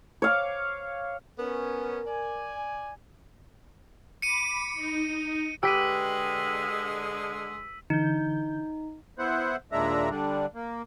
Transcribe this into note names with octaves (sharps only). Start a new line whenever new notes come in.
C#5 F5 D6
B3 C#4 A#4
D5 G#5
B5 D6 C#7 D#7
D#4
D3 G#3 G4 B4 G5 E6 B6 D#7
D3 E3 D#4 G6
B3 E4 C5 F#5
D#2 A#2 G#3 D4 E5 A#5
D3 G3 D4
A#3